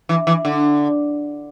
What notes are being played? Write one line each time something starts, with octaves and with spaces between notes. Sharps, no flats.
E3
E3
D3